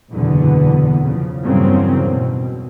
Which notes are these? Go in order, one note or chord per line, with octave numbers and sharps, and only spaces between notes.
F#1 E2 B2 D3 B3
C#3 F3
E2 G2 C#3 F#3 A#3 C4
B2